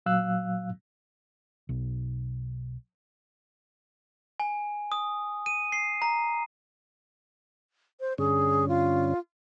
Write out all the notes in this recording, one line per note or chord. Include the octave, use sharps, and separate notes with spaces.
A#2 F#3 F5 E6 F#6
B1
G#5
D#6
D#7
C7
A#5
C5
G2 D3 C#4 G#4
F4